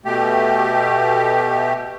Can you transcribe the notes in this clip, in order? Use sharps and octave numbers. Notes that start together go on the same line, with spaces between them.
B2 A3 G4